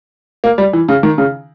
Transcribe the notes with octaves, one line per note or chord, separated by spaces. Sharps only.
A#3
G3
E3
C#3
D#3
C#3